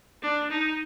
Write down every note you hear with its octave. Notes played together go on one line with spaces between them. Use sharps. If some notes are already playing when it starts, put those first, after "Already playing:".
D4
D#4